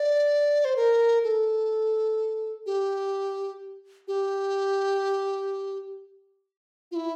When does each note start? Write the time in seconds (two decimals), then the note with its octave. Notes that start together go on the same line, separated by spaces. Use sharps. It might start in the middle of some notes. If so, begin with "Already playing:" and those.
Already playing: D5
0.65 C5
0.76 A#4
1.24 A4
2.66 G4
4.08 G4
6.91 F4
6.96 E4